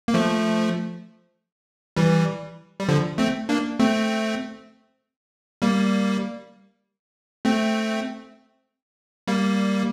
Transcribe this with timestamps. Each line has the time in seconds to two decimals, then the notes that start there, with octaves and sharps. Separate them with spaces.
0.08 A#3
0.14 F3 A3
1.96 E3 G3
2.80 G3
2.89 D3 F3
3.18 A3 C4
3.49 A#3 D4
3.79 A3 C4
5.62 G3 A#3
7.45 A3 C4
9.27 G3 A#3